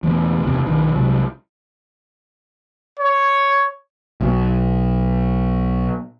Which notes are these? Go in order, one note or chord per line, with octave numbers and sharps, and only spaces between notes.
E1 E3 A3 B3
F#1 E2 G2 C3
B1 D#3 F3
C2 C3 F#3 G#3
C#5
B1 B2